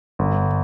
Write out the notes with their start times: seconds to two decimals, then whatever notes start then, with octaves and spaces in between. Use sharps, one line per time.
0.19 G1